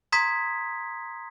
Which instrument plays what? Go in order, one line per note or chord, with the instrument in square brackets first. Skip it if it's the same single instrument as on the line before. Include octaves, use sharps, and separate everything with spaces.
[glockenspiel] A#5 C6 D#6 G#6 B6